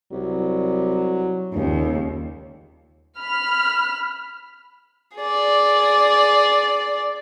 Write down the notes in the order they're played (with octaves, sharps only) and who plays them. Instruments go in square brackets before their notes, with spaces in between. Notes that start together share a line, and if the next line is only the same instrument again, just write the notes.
[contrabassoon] C2 [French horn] F#3
[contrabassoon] D#1 [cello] D#2 [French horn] C#3
[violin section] B5 F6
[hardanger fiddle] G#4 D5